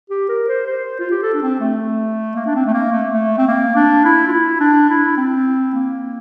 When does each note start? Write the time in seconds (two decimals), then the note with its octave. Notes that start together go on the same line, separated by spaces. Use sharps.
0.10 G4
0.28 A#4
0.48 C5
0.67 C5
0.99 F4
1.11 G4
1.22 A4
1.34 D4
1.42 C4
1.60 A3
2.35 A#3
2.46 D4
2.55 C4
2.66 A3
2.73 A#3
2.91 A3
3.13 A3
3.37 C4
3.48 A#3
3.75 D4
4.05 E4
4.27 F4
4.32 E4
4.60 D4
4.89 E4
5.17 C4
5.74 A#3